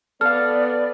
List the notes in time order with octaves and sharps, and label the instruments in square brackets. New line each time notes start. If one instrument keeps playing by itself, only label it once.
[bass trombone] B3 [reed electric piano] A4 F5 [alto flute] D5 [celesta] F6